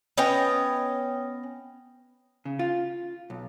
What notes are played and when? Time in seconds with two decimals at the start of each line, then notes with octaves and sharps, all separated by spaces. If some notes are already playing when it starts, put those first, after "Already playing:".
0.17 B3 C#4 D#5 G5
2.45 C#3
2.59 F4
3.30 B1